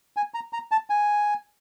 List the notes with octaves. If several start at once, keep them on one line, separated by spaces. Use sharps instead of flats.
G#5
A#5
A#5
A5
G#5